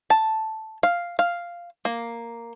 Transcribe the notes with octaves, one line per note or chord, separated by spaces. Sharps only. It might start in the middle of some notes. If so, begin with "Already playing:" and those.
A5
F5
F5
A#3